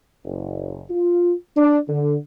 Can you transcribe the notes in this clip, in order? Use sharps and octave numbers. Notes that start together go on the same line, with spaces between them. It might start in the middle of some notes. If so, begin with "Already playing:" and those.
F#1
F4
D4
D3